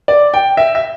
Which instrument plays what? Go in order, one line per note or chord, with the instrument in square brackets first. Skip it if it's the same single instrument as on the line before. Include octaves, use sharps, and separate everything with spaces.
[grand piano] D5
G5
E5
E5